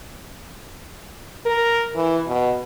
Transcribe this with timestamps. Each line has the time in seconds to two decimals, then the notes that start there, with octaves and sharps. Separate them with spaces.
1.45 A#4
1.95 E3
2.27 B2